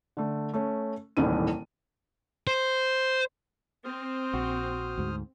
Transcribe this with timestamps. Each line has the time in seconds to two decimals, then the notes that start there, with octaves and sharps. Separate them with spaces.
0.17 D3 A3
0.53 A3 C#4
1.17 D#1 C2 A2 D#3 E3 D#7
2.47 C5
3.85 C4 C5 D#6 F6
4.34 A#1 F#4
4.98 D2 G#2